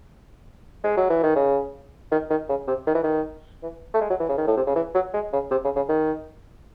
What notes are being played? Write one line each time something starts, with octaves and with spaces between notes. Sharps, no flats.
G#3
F#3
E3
D#3
C#3
D#3
D#3
C#3
C3
D#3
E3
D#3
E3
A3
G#3
F#3
E3
C#3
D#3
A2
C3
C#3
E3
F#3
G#3
C#3
C3
C#3
C#3
D#3